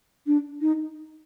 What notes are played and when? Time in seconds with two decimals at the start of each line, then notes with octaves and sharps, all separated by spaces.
0.27 D4
0.61 D#4